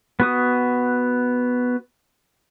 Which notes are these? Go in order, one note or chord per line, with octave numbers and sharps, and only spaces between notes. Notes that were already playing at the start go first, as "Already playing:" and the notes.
B3 F#4 D#6